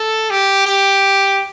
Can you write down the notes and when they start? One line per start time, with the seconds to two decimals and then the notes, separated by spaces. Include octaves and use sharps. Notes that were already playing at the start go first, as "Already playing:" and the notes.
Already playing: A4
0.30 G4
0.66 G4